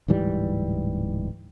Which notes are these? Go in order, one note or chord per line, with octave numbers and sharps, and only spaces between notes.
D1 G#2 E3 G3